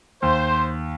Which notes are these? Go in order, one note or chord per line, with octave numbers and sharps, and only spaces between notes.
D#2 C5